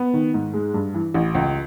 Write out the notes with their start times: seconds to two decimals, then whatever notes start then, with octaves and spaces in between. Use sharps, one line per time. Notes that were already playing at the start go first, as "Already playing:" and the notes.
Already playing: B3
0.14 D#3
0.34 G#2
0.54 G#3
0.74 G2
0.94 E3
1.14 A1
1.35 C#2